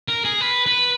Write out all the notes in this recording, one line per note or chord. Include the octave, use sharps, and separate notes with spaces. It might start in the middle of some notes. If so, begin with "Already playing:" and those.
A#4
G#4
B4
B4